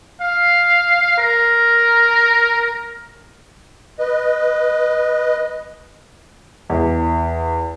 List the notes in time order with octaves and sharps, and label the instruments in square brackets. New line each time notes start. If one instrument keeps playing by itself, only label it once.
[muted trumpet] F5
A#4
[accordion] B4 D#5
[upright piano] E2